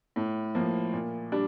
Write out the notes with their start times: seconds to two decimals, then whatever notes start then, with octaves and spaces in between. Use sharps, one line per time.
0.16 A2
0.55 F3 A#3
0.93 A#2
1.32 G3 D4